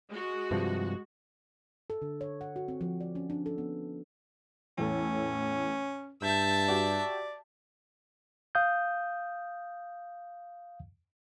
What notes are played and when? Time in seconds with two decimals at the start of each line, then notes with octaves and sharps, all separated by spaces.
0.10 G#3 F#4
0.51 G2 C3 F3
1.90 A4
2.02 D3
2.21 C#5
2.41 F#5
2.56 F#4
2.68 C4
2.81 F3
3.01 D5
3.15 C#4
3.30 D4
3.46 A4
3.58 B3
4.78 E2 A2 C#4 A4
6.22 G2 E5 A5 G6
6.68 F#4 G4 D5
8.55 F5 D#6 G6